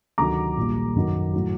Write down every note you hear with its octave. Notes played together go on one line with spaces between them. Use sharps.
D2 C3 D#3 F#3 A#5 D6
A#1 A#2 G3
F#2 D#3 F#3
A2 F#3